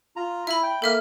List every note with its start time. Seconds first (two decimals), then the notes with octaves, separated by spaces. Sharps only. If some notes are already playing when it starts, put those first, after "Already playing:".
0.16 F4 A#5
0.47 E4 E5 B5
0.63 G5
0.82 A#3 A4 E5 F6